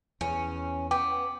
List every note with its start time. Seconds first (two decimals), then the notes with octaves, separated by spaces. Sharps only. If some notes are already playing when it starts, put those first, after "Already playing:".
0.21 E2 C#4
0.91 B3 G5 D6